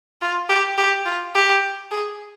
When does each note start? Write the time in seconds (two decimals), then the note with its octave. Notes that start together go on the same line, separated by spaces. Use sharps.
0.22 F4
0.50 G4
0.78 G4
1.05 F4
1.35 G4
1.91 G#4